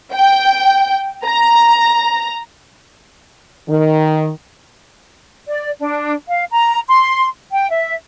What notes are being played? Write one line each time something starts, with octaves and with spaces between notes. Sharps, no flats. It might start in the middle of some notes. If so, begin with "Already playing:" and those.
G5
A#5
D#3
D5
D4
F5
A#5
C6
G5
E5